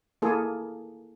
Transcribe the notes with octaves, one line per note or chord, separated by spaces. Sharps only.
A#3 E4 G#4 A4